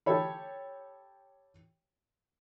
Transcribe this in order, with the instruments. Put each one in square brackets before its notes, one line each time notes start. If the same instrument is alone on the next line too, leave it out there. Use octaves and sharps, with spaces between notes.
[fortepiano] G4 A4 C#5 B5